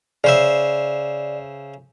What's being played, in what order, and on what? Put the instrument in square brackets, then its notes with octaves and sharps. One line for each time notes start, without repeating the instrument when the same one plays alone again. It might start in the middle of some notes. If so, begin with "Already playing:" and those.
[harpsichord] C#3 C5 E5 [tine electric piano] D5